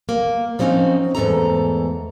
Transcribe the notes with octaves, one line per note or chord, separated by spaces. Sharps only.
A#3
F3 G3 C4 C#4 D#4 F#4
E2 G#2 A3 A4 A#5